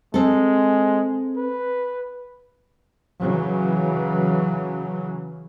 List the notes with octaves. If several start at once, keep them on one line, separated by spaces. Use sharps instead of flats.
G#3 C4 A4
B4
C#3 E3 F#3